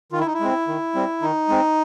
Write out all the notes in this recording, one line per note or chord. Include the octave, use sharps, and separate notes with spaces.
D#3 F4
E4
D#4
E4
G#3 C4
D#3
G3 C4
D#3 D#4
G#3 C4